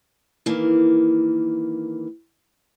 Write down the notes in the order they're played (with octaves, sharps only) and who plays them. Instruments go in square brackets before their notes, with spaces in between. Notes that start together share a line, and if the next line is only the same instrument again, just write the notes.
[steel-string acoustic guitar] D#3 E3 A#3